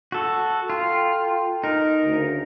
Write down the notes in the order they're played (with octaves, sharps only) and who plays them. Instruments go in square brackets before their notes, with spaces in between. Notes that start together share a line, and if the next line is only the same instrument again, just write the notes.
[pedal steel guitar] F#4 A4
[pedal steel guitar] F4 [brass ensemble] A4 G5
[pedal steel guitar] D#4 A#4
[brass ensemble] D2 C#3